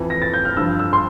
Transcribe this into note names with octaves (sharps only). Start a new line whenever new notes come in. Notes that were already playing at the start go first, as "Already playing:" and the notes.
Already playing: F2 E3
A#6
A6
G6
F6
G2 F3 E6
E6
C6